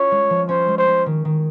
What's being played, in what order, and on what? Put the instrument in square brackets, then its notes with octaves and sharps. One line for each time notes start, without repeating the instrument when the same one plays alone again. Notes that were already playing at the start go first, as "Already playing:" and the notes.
Already playing: [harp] C#4 F4 [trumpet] C#5
[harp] G#3
F3
[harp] C#4 [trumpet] C5
[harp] G#3
[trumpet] C5
[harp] C#4
D#3
D#3